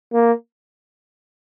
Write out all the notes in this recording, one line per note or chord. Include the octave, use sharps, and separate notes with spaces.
A#3